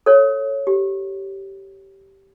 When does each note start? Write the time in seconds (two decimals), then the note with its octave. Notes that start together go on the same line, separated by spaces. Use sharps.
0.06 A4 C#5
0.67 G4